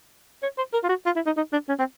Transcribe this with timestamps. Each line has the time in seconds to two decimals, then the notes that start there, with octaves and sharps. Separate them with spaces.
0.43 C#5
0.57 C5
0.73 A#4
0.83 F4
0.89 F#4
1.06 F4
1.16 E4
1.26 D#4
1.37 D#4
1.52 D4
1.68 C#4
1.79 C4